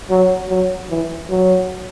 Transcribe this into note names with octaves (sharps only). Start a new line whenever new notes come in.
F#3
F#3
E3
F#3